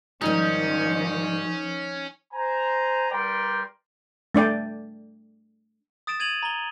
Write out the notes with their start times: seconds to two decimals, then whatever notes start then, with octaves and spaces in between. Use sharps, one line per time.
0.21 G#2 D#3 F3 G3 C#4 D#4
2.33 C5 G#5 A#5
3.11 G3 A#4 B4 D5 G5 C6
4.35 A3 D4 D5 G5
6.07 D#6 A6 D7 E7
6.20 G#6 D#7 F7 F#7
6.43 A#5 G7